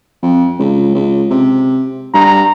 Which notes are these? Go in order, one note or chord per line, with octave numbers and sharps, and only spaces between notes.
F2
C#2
C#2
C3
G2 A#5